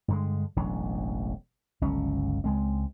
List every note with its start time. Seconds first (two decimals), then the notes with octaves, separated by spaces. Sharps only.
0.08 G2 D3 G#3
0.56 E1 A1 F#3 D4
1.81 G1 C#2 F#3 C#4
2.44 C#2 G#3 C4